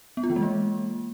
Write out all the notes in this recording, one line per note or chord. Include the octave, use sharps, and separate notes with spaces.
B3
F4
E3
G#3
A#3